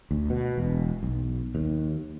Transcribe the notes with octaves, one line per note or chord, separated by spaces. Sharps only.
D2
B2
E1
B1
D#2